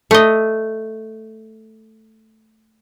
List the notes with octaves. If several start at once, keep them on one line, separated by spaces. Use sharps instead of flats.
A3 D#5